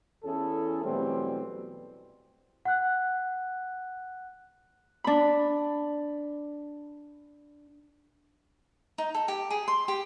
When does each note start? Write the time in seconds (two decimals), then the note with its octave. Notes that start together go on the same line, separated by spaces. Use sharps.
0.24 E2 C#4 E4 G#4 A4
0.83 B2 E3 F#3 G3 A3 C4
2.65 F#5 F#6
5.04 D4 B5
8.98 D#4
9.15 A4
9.28 G4
9.50 G#4
9.68 C6
9.88 G4